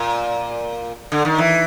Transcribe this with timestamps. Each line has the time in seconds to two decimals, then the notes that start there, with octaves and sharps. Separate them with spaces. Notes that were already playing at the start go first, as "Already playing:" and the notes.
Already playing: A#2
1.12 D3
1.25 D#3
1.38 E3